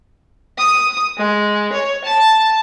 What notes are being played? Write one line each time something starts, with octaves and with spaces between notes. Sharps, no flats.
D#6
G#3
C#5
A5